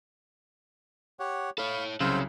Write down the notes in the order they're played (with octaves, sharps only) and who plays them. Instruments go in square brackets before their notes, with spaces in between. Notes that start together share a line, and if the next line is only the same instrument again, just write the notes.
[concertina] G4 C#5 F#5
[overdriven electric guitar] A4 C#5 [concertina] F5 B5
[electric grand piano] C2 C#3 [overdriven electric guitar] F#3 [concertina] C5 F5 E6